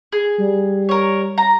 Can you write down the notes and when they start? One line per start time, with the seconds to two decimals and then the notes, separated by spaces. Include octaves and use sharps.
0.12 G#4
0.38 G3
0.89 A#4 C#5
1.38 A#5